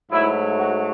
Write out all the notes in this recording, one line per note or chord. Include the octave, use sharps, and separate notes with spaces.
G#2 F#3 A3 E4
F#4